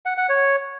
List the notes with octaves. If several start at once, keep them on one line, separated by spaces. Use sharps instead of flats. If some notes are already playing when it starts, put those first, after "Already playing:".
F#5
F#5
C#5